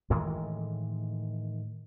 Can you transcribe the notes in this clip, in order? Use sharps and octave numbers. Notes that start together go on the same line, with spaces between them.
A2 D#3 E3 G#3